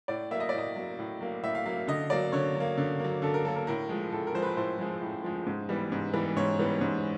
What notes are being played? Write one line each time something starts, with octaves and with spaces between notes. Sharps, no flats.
A2 D5
F#3 A#3 E5
D#5
D5
A2 D#5
F#3 A#3
A2
F#3 A#3
A2 E5
F5
F#3 A#3 F5
D3 D#5
F#3 A#3 D5
D3 C#5
F#3
A#3
D3
F#3 A#3
D3 A4
A#4
F#3 A#3 A4
A#4
A2 A#4
F3 G#3
A2 A4
A#4
F3 G#3 B4 C5
A2 C5
F3 G#3
A2
F3 G#3
G#2
E3 G3 B3
G#2
E3 G3 B3
G#2 C#5
E3 G3 B3
G#2